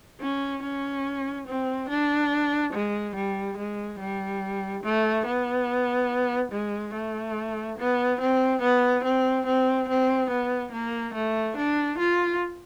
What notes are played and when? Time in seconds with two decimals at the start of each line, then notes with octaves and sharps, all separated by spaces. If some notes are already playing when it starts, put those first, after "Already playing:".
0.21 C#4
0.63 C#4
1.48 C4
1.89 D4
2.74 G#3
3.16 G3
3.58 G#3
4.00 G3
4.84 A3
5.26 B3
6.52 G#3
6.94 A3
7.78 B3
8.20 C4
8.62 B3
9.04 C4
9.46 C4
9.89 C4
10.30 B3
10.72 A#3
11.15 A3
11.57 D4
11.99 F4